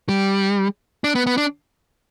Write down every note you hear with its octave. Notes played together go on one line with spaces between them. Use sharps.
G3
D4
B3
B3
D4